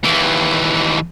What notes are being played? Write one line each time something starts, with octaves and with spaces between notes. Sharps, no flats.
D#2 E3